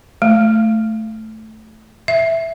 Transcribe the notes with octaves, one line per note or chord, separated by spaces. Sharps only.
A3
E5